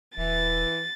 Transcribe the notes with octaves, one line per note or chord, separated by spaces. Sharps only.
D#1 E3 A6